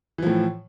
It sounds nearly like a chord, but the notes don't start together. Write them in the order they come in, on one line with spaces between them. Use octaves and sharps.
E3 F3 A2